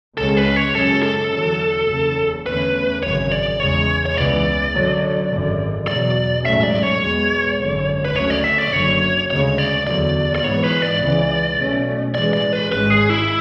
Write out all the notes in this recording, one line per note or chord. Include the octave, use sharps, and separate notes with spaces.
C#2 C#3 G#3 C#4 A4
B4
C#5
F#2 C#3 G#3 C#4 A4
A4
E2 D3 F#3
F#1 E2 C#3
E2 D3 A3 C#4 B4
G#1 F#2 C#3 C#5
D5
E2 C#3 G#3 C#5
C#5
C#2 C#3 E3 B3 D5
F#2 D3 F#3
G#1 F#2 D3
E2 B2 F#3 D5
A1 G#2 F#3 A3 C#4 E5
D5
C#5
E2 B2 G#3 B3
G#1 F#2 D3
B4
D2 C#3 F#3 A3 C#4 C#5
D5
E5
D5
F#1 F#2 D3 F#3 C#5
D2 C#3 G#3 C#5
D5
E2 D3 F#3 D5
D5
G#2 E3 B3 C#5
B4
D5
C#2 C#3 E3
B1 B2 A3 C#4
A1 A2 E3 G#3 D5
D5
B4
G#1 G#2 G#3 C#4 B4
G#4
E4